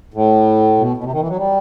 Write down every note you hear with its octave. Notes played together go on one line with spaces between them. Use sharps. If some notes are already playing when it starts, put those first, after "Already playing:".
A2
B2
B2
C3
D#3
E3
F#3
G3